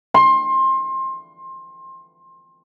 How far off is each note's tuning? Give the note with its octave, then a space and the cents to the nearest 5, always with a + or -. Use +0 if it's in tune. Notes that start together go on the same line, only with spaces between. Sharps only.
C6 +25